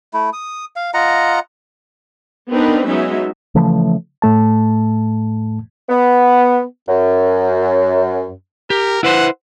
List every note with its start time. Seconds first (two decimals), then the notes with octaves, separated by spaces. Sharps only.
0.14 A3 E4
0.33 D#6
0.76 F5
0.94 F4 D#5 F#5 A#5
2.50 B3 C4 D4 D#4 A#4 B4
2.87 F#3 G#3 B3 C#4 D#4 E5
3.55 C#3 E3 F3 A3
4.22 A2 A3 A5
5.89 B3
6.88 F#2
8.70 G4 A#4
9.03 E4 B4 C5 F#5